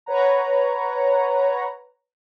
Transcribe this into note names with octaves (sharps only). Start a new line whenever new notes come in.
B4 C#5 F#5 A#5